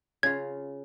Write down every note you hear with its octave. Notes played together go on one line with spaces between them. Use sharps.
C#3 F4 G#6